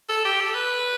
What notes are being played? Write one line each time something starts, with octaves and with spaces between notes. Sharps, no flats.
A4
G4
A4
B4